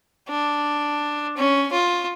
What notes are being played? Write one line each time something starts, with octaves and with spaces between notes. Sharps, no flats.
D4
C#4
F4